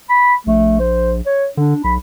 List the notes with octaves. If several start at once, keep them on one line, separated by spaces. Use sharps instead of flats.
B5
A#1 A3
C5
C#5
D3 D4
B1 B5